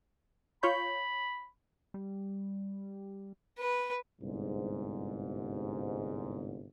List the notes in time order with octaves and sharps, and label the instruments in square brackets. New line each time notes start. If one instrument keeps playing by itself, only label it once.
[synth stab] F4 C#5 G6 [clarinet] B5
[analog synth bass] G3
[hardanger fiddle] B4
[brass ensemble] G1 C2 G#2